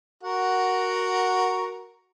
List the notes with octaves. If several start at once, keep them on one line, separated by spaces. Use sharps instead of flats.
F#4 A#4 F#5